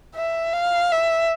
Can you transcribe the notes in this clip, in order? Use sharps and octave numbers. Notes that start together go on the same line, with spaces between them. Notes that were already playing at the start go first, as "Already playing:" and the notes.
E5
F5
E5